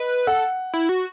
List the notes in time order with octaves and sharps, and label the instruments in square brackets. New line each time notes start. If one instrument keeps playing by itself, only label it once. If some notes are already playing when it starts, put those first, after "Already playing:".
Already playing: [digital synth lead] B4 [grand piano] D#5
[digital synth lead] A4 [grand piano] F#5
[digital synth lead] E4
F#4